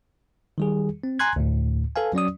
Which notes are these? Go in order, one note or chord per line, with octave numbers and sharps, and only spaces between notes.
D#3 G3 G#4
C4
G#5 A#5 C6 F#6 G#6
D2 A2
A4 B4 F5 G#5
F#3 C#4 D5 D#6